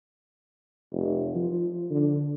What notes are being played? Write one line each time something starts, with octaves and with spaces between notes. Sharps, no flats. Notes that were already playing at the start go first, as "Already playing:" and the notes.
F1
F3
D3